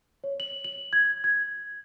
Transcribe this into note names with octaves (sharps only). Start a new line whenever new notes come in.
C#5
F#7
F#7
G#6
G#6